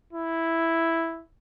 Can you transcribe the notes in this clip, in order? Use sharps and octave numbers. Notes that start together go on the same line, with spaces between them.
E4